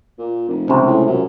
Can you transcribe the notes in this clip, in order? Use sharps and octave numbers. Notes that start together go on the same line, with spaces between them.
A#2
F1
C#2 C3
A2
F#2